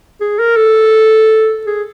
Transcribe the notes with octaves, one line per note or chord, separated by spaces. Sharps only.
G#4
A#4
A4
G#4